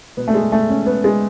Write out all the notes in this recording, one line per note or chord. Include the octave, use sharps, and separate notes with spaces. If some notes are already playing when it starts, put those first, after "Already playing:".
B2 B3
A3
G#3
A3
C#4
B3
G#3